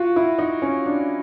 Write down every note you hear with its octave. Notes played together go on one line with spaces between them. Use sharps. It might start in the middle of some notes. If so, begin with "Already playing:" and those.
Already playing: F4 F#4
E4
D#4
C#4
D4